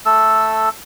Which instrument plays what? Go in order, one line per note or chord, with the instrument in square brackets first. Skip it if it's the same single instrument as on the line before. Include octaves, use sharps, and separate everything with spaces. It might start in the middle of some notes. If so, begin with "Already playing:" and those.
[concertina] A3 A4 E6